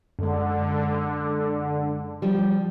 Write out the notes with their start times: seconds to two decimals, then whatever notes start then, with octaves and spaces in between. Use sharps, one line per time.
0.19 F#2 D3 G#3
2.22 F3 G3